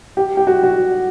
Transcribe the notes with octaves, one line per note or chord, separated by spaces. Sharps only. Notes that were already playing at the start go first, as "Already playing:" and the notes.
G4
G4
F#4
F#4